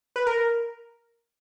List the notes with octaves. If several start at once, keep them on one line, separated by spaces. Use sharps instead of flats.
B4
A#4